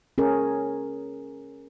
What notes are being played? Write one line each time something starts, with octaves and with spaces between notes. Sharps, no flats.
C#4 G#4 A#4